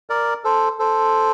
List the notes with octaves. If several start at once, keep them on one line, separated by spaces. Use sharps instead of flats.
A#4 D5
A4 C5
A4 C5